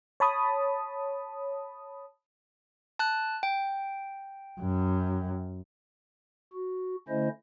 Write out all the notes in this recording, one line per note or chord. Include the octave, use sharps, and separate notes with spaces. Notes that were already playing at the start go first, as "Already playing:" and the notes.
C#5 A5 B5 D#6
A5 F#6
G5
F#2
F#4
D3 A3 C#4 E4 C5 D#5